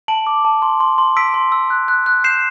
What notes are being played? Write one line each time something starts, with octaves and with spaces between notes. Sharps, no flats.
A5 D7 F#7
D6
A5
C6
C6
C6
E6 B6 D7
C6
E6
F#6
F#6
F#6
G6 C7 E7